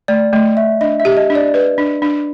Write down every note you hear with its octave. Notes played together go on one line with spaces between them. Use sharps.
A3 D5
A3 D#5
A3 E5
D4 D#5
E5
G4
D#5
D4
D5
B4
D4
D4